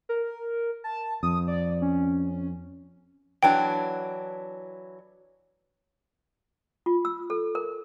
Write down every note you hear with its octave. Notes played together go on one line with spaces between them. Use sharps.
A#4
A5
F2 D#6
D5
C#4
E3 F#3 D4 G5
F4
E6
A4
A#4